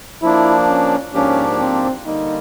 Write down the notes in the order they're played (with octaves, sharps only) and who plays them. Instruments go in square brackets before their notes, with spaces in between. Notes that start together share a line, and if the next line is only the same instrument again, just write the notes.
[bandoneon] F3 A#3 D4 [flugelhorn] E4
[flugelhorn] C#4
[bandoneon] G#2 F3 A#3 D4 G4 [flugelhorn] C#4
[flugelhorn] C4
[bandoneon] D3 G3 A#3 [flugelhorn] D#4